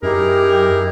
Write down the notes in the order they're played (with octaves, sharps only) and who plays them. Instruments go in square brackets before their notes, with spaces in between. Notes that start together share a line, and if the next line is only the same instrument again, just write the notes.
[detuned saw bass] F#2 [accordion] D#4 E4 G#4 [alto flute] G4 [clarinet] A#4